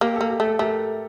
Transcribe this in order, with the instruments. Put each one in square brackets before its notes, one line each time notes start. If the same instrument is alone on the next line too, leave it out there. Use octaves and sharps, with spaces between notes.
[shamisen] A#3 [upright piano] G4
[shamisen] A#3 [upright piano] A4
[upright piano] G4
[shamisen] A3
[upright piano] A4
[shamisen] A3 [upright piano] G4 A#4